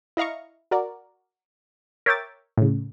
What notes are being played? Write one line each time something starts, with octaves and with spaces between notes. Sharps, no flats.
E4 D#5 F5 A#5 C#6
F#4 A#4 D5
A#4 C#5 E5 G5 D6 A6
A2 C#3